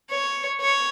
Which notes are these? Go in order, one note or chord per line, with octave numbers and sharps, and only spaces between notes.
C#5
C#5